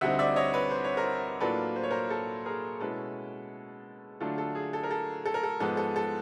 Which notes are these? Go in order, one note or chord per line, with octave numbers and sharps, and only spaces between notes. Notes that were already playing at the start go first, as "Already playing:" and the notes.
D2 D3 G3 C4 D#4 E5 F#5
D5 E5
C#5 D#5
B4 C#5
C5
C#5
A#4 C5
A2 F#3 A#3 D4 F4 A4 B4
C5
C#5
A#4 C5
A4
G#4 A#4
B2 G#3 C#4 E4 A4 B4
D3 F#3 A3 D4 F4 A4
A4
G#4
A4
A#4
A4
A4
A#4
A4
G#2 F3 G#3 B3 A4
A4
A4